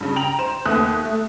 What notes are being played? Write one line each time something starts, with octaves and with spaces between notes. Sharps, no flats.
G2 C#3
G5 A#5 F7 F#7
C5 E7
D#2 A3 B3 D#6 F#6
A3